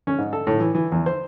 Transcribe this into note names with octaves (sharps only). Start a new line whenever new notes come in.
C#4
G#2
A4
A2
E3
E3
E2
C5